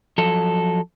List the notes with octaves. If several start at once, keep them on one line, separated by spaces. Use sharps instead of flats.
F3 F#3 A4